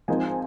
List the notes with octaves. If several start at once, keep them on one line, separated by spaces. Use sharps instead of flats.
F3 G#3 C4 D#4 G#5